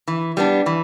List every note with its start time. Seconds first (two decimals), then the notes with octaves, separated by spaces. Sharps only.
0.07 E3
0.37 G3 B3 D4
0.66 E3